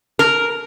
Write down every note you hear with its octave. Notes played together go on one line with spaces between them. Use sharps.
A#4